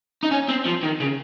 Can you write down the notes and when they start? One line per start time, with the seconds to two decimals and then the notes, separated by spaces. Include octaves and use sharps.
0.23 D#4
0.31 C#4
0.48 C4
0.65 F3
0.83 D#3
1.00 C#3